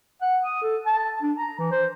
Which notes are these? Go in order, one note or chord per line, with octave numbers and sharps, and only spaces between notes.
F#5
D#6
A4
A5
D4
A#5
E3
C5